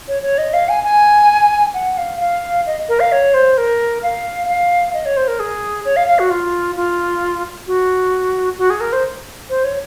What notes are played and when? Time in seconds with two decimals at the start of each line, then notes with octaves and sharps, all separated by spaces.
0.08 C#5
0.22 C#5
0.38 D#5
0.53 F5
0.69 G#5
0.84 G#5
1.74 F#5
1.98 F5
2.20 F5
2.66 D#5
2.89 A#4
3.00 F5
3.12 C#5
3.34 C5
3.58 A#4
4.03 F5
4.48 F5
4.94 D#5
5.05 C#5
5.17 C5
5.28 A#4
5.40 G#4
5.85 C#5
5.96 F5
6.08 F5
6.19 F#4
6.30 F4
6.76 F4
7.67 F#4
8.58 F#4
8.70 G#4
8.81 A#4
8.93 C5
9.50 C5
9.64 C#5